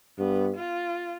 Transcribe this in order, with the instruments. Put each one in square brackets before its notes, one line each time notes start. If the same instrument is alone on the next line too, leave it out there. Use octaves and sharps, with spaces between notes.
[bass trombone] G2 [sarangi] B3
[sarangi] F4